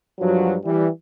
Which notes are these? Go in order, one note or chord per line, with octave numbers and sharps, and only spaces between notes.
G2 F3 F#3
E3 G3